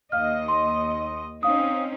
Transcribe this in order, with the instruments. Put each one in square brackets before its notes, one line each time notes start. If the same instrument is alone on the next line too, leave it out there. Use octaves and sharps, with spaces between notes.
[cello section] D#2 D#5 [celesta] F5 F6
[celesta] C6
[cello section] C4 C#4 D#4 [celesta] F5 D#6